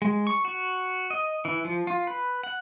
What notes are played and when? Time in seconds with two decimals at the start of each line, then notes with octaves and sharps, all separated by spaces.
0.02 G#3
0.27 C#6
0.45 F#4
1.10 D#5
1.45 E3
1.65 F3
1.87 F4
2.07 B4
2.43 F#5